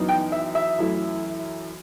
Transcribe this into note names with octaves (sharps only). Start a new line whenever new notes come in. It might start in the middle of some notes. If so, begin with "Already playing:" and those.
Already playing: F#2 E3 B3 D#4
G5
E5
E5
F#2 E3 A3 E4